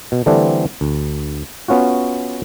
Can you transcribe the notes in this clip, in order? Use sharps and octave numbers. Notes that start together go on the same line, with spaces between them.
B2
D3 E3 G3 A3 C4 D4
D2
B3 C#4 F4 F#4